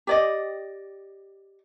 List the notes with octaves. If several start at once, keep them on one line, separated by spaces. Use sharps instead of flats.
G4 D5 D#5